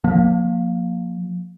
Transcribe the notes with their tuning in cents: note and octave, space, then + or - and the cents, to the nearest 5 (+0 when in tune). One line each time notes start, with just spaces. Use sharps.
F3 +35 A#3 +5